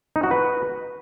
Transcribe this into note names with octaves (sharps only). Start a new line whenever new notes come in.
D#4
F#4
B4